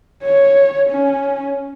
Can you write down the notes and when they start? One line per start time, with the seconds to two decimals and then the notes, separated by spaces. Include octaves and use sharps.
0.23 C#5
0.90 C#4